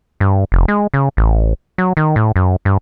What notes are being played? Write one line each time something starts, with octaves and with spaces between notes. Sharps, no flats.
G2
F1
G#3
C#3
A1
F#3
D#3
A2
F#2
G2